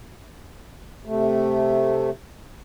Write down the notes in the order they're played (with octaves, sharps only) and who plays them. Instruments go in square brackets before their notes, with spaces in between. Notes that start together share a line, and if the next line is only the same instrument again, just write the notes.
[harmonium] C3 A3